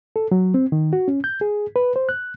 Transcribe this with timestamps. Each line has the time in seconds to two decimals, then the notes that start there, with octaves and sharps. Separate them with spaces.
0.16 A4
0.32 F#3
0.54 C4
0.72 D#3
0.93 F#4
1.08 C#4
1.24 G6
1.41 G#4
1.76 B4
1.96 C5
2.09 F#6